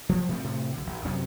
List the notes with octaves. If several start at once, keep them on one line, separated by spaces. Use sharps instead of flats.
F3 G3
A#2 A3 C4
A2 C3 A3
B1 D3
G#1
F#2 C3 F#3 C#4